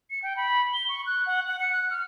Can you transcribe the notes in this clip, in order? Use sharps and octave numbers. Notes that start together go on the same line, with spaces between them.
C#7
G5
B5
G7
C#6
F#6
F#5
F#5
C#7
F#6
F6